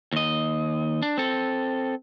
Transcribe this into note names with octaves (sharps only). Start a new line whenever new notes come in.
D#2 D#5
D4
C4 A4